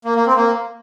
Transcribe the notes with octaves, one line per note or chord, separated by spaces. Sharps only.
A#3
A#3
C4
A#3